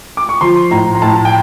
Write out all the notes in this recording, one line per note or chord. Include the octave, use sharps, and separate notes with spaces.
D6
C#6
F3 C6
A2 A#5
A#5
A2 A5
G5